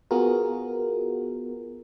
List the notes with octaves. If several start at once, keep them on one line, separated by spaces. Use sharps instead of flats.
B3 F4 F#4 G#4 A#4